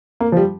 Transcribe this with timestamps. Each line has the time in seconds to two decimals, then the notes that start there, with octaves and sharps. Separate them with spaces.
0.20 A#3
0.32 F3
0.37 G3